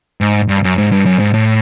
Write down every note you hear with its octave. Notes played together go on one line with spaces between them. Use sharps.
G#2
G2
F#2
G#2
G2
F#2
G#2
A2